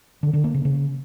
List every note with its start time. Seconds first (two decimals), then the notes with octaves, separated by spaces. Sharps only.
0.23 D3
0.33 D3
0.44 A#3
0.54 C#3
0.65 C#3